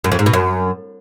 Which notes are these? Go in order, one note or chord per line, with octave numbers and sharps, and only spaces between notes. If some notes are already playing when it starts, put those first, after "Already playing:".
F#2
F2
G#2
B2
F#2